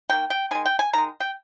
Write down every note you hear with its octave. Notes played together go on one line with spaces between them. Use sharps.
D#3 A#3 G5
G5
D#3 G#3 G#5
G5
G#5
D#3 G#3 A#5
G5